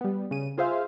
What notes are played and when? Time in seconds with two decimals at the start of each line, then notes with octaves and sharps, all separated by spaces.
0.01 G3 B3
0.31 C#3 D#7
0.58 F4 G#4 C5 E5 F5